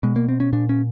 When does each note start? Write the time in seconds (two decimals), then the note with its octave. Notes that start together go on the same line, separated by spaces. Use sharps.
0.03 B2 G#3
0.16 A#3
0.29 C4
0.40 C#4
0.53 A#2 D4
0.69 C#4